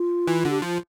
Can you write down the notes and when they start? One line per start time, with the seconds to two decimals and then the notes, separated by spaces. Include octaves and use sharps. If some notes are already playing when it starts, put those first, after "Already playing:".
Already playing: F4
0.27 E3
0.45 D3
0.50 G4
0.62 F3 F4